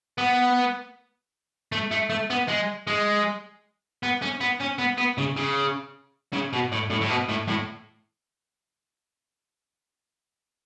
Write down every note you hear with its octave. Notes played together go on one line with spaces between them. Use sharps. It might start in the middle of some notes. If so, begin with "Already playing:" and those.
B3
A3
A3
A3
B3
G#3
G#3
B3
C#4
B3
C#4
B3
B3
C#3
C#3
C#3
B2
A2
A2
A2
B2
A2
A2